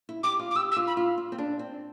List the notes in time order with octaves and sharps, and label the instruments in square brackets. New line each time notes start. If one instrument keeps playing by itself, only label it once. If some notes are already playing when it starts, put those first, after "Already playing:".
[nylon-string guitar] E4
[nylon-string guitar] G4 [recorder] D6
[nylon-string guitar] F4
[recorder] D6
[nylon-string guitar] G4 [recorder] E6
[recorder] E6
[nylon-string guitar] F4
[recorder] B5
[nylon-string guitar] F4
F4
C4
D4
C4